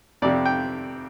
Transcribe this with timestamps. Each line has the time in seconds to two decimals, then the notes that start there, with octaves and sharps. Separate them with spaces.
0.22 F2 D5
0.25 C3
0.46 G5